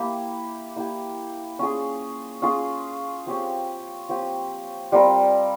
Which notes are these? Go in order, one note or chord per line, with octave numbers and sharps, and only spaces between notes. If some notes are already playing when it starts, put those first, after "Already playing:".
Already playing: A#3 E4 G4
A#3 E4 G4
C#4 F4 G#4
C#4 F4 G#4
F3 C4 G4 C#5
F3 C4 G4 C#5
G3 C4 F4 A#4